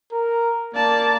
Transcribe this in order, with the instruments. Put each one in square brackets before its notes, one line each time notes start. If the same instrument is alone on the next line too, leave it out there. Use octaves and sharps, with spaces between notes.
[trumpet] A#4
[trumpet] A#3 [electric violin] D5 A5